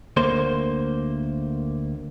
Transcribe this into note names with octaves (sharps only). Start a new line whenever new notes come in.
D2 A#3 C5